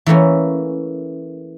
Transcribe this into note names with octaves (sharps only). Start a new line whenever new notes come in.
E3 A3 A#3 C#4